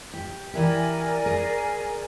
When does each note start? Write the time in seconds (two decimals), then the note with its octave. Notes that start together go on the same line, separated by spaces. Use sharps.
0.14 G4
0.54 E3 E4 G4 A#4 D5 G#5
1.26 G#4